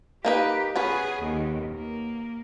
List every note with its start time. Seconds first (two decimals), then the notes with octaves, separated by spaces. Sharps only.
0.25 A#3 D#4 G4 B4
0.76 B3 C#4 G#4 B4
1.22 D#2
1.74 A#3